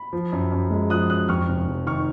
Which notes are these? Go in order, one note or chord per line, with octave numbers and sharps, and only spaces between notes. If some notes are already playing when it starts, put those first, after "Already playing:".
Already playing: B5
F3
F#2
F#2
G#3
F3 D#6 F#6
F#2 D#6 F#6
F2 C#6 F6
F1
F1
D#3 C#6 F6